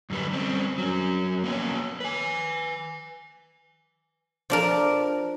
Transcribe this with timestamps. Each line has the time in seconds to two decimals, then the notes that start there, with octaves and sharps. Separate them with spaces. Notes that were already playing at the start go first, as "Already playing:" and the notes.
0.10 F#2 D3 G3 B4
0.33 G3 C4 C#4
0.78 F#3 C#4
1.44 A#3 B3 C#5
2.00 B4 G#5
4.50 F3 D4 A#4